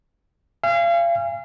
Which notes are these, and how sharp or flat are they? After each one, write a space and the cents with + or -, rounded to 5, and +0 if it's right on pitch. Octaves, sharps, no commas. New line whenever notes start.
F5 -35 G#5 -30